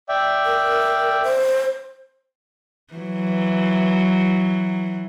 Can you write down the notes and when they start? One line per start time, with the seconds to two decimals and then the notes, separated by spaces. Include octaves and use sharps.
0.09 D5 E5 G5
0.46 A#4
1.24 C5
2.94 E3 F#3